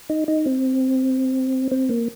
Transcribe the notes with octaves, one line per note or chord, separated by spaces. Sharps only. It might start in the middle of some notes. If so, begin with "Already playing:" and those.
D#4
D#4
C4
C4
A#3